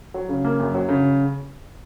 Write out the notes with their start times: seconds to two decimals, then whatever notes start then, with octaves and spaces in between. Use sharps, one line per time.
0.14 F#3
0.29 C#3
0.45 A#3
0.60 F#2
0.74 F#3
0.89 C#3